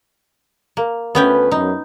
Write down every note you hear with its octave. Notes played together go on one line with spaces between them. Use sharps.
A#3
D2 A3 B3 C#4 B4 G5
F#2 D#4